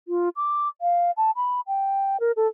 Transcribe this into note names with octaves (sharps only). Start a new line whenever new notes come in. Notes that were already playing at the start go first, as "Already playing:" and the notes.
F4
D6
F5
A5
B5
G5
A#4
A4